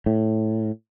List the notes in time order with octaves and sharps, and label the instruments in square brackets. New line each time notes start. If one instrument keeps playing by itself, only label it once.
[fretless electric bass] A2